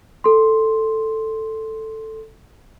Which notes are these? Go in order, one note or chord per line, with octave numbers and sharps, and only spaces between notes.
A4 C6